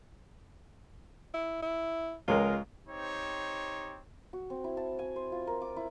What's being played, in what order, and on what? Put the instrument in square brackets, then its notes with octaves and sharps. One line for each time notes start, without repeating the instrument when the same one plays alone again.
[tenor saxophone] E4
E4
[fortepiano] C#2 G#3 A#4 [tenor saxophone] F4
[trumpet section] C4 D#4 G4 C5 C#5
[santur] F#4
C4
E4
A5
G#5
C5
F4
A#4
D6
E4